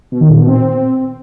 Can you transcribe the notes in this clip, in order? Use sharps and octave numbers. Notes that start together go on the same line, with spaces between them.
B2
D#3
A#2
B2
C4